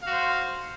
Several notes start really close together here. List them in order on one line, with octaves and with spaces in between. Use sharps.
F5 F#4 C5